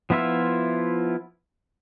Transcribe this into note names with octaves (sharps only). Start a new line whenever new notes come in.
F3 B3 E4 F4 E5